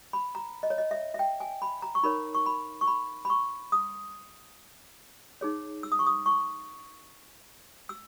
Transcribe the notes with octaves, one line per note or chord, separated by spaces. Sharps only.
B5
A#5
D#5
C#5
D#5
E5
E5
G5
G#5
B5
A#5
C#6
D#4 A#4 C#5 B5
C#6
B5
C#6
B5
B5
C#6
D#6
D#4 G#4 C#5
E6
D#6
C#6
D#6
C#6
E6